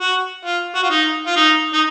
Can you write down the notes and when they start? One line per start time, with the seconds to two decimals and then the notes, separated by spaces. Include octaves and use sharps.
0.01 F#4
0.45 F4
0.75 F#4
0.83 F4
0.90 D#4
1.26 F4
1.36 D#4
1.73 D#4